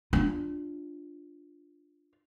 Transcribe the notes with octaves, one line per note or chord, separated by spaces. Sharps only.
D4 F4